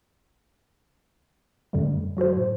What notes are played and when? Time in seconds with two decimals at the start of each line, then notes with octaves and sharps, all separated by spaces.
1.73 F#2 D3 G3 A3
2.17 F#3 F#4 A4 C5
2.37 A2